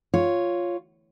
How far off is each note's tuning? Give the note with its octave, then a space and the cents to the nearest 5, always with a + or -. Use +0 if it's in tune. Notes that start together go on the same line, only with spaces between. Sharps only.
F4 +0 C#5 +0